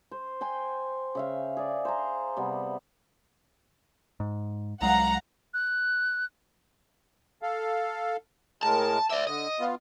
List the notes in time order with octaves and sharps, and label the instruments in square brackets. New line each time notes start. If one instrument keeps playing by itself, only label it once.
[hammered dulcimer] C5
C5 G5 G#5 C6
C#3 E5 F5
G#4 D5
C5 G#5 A#5
C3 G3 B3
[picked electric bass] G#2
[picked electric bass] C2 F#3 G#3 [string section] F5 F#5 A#5
[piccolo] F#6
[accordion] A4 F5
[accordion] A2 G#3 A#4 [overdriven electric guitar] A5
[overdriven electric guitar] D5 E5 [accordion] D6
[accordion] D3 [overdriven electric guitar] D#5
[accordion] B3 F4